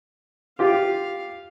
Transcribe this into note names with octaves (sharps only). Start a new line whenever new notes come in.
F4 G4 F5